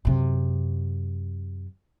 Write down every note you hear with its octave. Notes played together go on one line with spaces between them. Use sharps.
F#2 C3